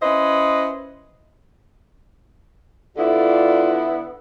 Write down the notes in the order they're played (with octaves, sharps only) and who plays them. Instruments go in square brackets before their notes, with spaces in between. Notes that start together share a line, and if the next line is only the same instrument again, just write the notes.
[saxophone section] C#4 E4 B4 C5 D#5
[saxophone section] D3 B3 E4 [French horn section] F4 A4 D5